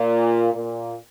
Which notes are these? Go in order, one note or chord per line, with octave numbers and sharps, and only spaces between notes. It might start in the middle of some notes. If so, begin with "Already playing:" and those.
Already playing: A#2
A#2